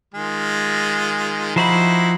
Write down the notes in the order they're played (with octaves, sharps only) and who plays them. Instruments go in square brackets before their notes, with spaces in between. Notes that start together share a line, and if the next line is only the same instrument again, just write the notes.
[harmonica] D#3 G#3 F4
[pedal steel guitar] F3 C5 B5 [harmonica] D#4 E4 F#4